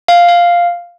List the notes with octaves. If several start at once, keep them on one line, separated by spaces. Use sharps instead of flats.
F5
F5